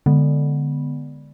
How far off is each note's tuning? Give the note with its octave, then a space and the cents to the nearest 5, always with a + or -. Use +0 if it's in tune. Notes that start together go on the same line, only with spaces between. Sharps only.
D3 +0 G#3 -10 B3 -10